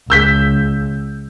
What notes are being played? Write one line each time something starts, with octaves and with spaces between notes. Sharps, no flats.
C#2 E6 G6 B6